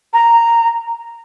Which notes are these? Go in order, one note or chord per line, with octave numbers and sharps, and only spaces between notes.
A#5